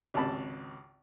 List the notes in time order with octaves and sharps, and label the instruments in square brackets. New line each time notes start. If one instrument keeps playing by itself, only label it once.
[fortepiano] G#1 C#2 C3 A5 B5